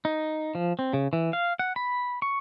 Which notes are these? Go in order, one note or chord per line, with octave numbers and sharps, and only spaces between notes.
D#4
F3
C4
C#3
E3
F5
F#5
B5
C#6